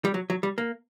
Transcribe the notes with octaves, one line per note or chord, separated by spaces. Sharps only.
G3
F#3
F#3
G3
A#3